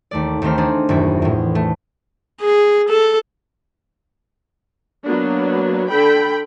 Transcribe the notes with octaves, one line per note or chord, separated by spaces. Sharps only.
D#2 A3 D5
D#2 D#3 A3 C4 C5 F6
C4 D4 D#4 G#4
D#1 F#2 E4
E2 A2
A3
G#4
A4
F#3 A#3 B3 D4
D3 A4 G5 B5